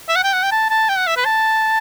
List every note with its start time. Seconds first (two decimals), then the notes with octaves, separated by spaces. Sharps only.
0.09 E5
0.16 F#5
0.24 G5
0.33 F#5
0.43 G5
0.52 A5
0.70 A5
0.89 G5
0.97 F#5
1.07 E5
1.17 B4
1.25 A5